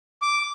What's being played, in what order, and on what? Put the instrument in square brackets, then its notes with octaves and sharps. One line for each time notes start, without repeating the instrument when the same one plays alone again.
[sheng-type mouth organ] D6